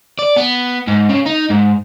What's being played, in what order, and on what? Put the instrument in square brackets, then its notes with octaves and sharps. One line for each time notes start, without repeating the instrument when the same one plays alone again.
[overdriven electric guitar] D5
B3
G#2
C#3
D#4
G#2